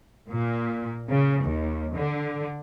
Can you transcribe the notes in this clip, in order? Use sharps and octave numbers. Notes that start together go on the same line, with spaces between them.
A#2
C#3
D#2
D3